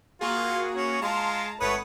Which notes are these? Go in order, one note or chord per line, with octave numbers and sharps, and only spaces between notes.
A#3 F4 F#4 G#4
C#4
G#3 F4 A5 A#5
G#1 A3 B4 C#5 F#5 D#6